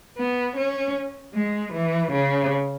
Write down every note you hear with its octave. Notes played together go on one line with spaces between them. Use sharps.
B3
C#4
G#3
E3
C#3